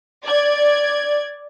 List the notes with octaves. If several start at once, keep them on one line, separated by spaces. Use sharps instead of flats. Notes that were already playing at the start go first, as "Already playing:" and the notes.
D5 G#6